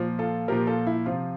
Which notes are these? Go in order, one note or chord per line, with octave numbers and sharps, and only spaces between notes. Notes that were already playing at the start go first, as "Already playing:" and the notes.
Already playing: A#2 F3
F4 A4
A#2 F3 G4 A#4
F4 A4
E4
C3 F3 F4